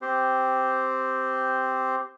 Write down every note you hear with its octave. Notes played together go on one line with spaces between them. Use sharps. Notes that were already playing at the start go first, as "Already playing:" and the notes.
C4 G4 C5